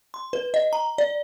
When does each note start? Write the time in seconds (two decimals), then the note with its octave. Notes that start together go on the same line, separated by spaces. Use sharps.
0.14 C6
0.33 B4
0.54 D#5
0.73 A#5
0.98 D5